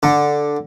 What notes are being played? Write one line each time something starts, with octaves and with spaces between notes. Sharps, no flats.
D3